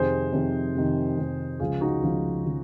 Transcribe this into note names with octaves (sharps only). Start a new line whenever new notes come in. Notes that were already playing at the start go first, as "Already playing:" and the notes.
Already playing: F2 C3 D#3 G#4 C5
F2 C3 D#3
F2 C3 D#3
F2 C3 D#3
C#2 C#3 F3 F4 G#4
D#4 F#4
C#2 C#3 F3 F4
C#3 F3